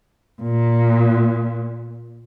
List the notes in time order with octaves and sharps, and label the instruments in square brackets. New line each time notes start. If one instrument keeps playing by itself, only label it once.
[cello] A#2